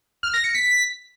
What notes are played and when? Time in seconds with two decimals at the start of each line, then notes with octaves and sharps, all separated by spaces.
0.23 F6
0.34 A#6
0.44 C#7
0.55 B6